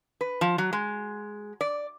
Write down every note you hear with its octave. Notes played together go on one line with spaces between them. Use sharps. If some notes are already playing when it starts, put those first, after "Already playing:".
B4
F3
F#3
G#3
D5